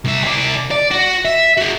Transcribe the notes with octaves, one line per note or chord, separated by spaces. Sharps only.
C2 E5
C3 D5
D5
F#4
E5
F#4 G#4